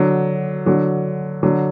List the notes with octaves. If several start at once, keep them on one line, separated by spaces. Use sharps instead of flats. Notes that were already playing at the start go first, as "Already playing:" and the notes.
Already playing: D3 F#3
D3 F#3
D3 F#3